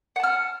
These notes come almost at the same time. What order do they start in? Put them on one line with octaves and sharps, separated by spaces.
F#5 A5 F6